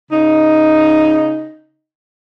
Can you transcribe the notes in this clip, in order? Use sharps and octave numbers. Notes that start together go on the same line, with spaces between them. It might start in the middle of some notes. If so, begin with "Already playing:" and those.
C#3 D#4